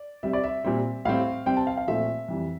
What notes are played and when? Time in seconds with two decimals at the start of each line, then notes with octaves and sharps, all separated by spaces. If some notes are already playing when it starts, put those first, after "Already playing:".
Already playing: D5
0.23 C3 G3 C4 E5
0.33 D5
0.44 E5
0.64 A#2 G3 C4
1.05 A2 G3 C4 F5
1.46 C3 G3 C4 G5
1.57 A5
1.67 F5
1.77 F5
1.87 A#2 F3 A3 C4 E5
2.29 F2 E3 G3